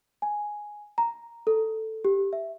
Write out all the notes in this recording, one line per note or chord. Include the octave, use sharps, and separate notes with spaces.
G#5
A#5
A4
G4
E5